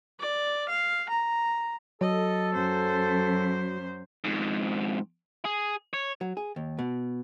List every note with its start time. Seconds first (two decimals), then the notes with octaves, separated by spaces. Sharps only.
0.20 D5
0.69 F5
1.10 A#5
2.01 F#3 A4 D#5
2.55 F#2 C5
4.24 F2 G#2
5.45 G#4
5.93 C#5
6.21 F#3
6.37 G#4
6.56 D#2
6.79 B2